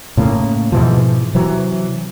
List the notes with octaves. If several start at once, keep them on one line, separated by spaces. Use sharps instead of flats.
A2 C#3 A#3
G#2 B2 E3 F3
C3 E3 F#3